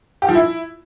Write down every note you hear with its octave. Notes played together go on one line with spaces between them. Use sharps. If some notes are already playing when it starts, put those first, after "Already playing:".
G4
F3
E4